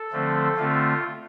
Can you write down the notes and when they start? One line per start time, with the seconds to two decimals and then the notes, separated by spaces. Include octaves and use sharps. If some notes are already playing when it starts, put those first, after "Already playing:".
Already playing: A4
0.12 D3 F3 A3 C4
0.57 D3 A3 C4 F4